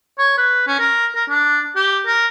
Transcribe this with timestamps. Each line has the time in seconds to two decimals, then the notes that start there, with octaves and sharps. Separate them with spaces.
0.19 C#5
0.38 B4
0.67 C#4
0.79 A#4
1.15 A#4
1.29 D4
1.76 G4
2.06 A#4